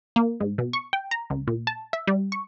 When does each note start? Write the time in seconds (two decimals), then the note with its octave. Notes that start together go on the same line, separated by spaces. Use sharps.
0.16 A#3
0.40 G#2
0.58 B2
0.73 C#6
0.93 G5
1.11 A#5
1.30 C#2
1.47 A#2
1.67 A5
1.93 E5
2.08 G3
2.32 C#6